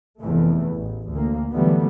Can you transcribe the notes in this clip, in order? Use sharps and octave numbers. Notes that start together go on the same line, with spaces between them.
F1 E2 E3 A3
A1
D2 A#3
D3 E3 F#3 G3 A3 B3